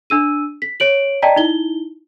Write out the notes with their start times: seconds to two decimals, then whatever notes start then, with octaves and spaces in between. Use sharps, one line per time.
0.10 D4 E6 D#7
0.62 B6
0.80 C#5 D7 F#7
1.22 D5 D#5 G5 A5 A#5 B6
1.36 D#4 E4 G7